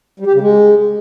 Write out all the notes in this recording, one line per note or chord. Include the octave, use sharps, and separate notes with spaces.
G3
G4
C#3
G#3